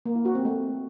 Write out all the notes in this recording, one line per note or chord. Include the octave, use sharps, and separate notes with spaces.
A#3
E4
F#4
C4
A3